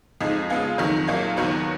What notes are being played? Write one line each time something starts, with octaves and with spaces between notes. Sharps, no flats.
F2 F3 G#3 D#4 G#4
C#3 G#3 B3 F4 G#4
F2 D#3 F#3
A#2 F#3 A#3 F4 G#4
D#2 D#3 F#3 B3 F#4